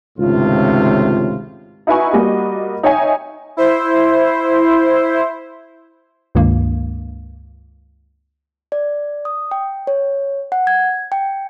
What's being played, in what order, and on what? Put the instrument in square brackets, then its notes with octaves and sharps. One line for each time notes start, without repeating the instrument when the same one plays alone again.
[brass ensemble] G#1 C#2 A2 C3 F4
[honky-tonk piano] D#4 E4 F#4 B4 G#5 C#6
G3 A#3 F#4 D#5
D#4 C#5 E5 G5 G#5
[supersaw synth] E4 C5
[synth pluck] C#2 G2 D#3 A#3
[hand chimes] D5
D#6
G5
C#5
F#5
G#6
G5